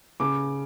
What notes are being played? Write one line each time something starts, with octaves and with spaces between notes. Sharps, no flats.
C#3 D6